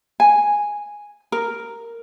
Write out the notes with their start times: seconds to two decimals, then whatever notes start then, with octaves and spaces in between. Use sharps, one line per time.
0.20 G#5
1.32 A#4